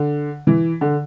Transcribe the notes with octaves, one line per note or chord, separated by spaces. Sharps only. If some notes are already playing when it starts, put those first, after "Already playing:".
Already playing: D3
E3
D3